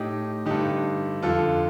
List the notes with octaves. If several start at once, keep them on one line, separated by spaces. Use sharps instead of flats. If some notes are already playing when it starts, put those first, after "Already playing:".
Already playing: A2 D#4 G4
G2 D3 D#4 G4
F2 D3 F4 A4